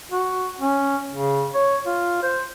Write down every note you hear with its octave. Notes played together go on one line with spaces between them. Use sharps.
F#4
C#4
C#3
C#5
F4
C5